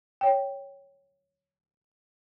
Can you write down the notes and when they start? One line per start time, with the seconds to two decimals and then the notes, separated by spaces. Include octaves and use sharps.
0.21 C#5 G5